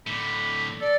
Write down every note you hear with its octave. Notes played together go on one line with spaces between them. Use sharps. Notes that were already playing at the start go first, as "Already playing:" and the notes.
A2 D3 B5
A4 D5